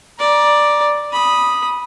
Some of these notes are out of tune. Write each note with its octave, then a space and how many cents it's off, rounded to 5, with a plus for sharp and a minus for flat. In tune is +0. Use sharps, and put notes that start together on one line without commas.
D5 +5 A#5 +25
B5 -10 D#6 +0